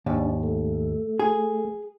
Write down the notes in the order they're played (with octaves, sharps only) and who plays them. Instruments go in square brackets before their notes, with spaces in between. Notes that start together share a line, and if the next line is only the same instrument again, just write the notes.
[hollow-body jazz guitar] D#2 G#2 [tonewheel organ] D4
[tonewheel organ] A3
[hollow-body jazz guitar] G#4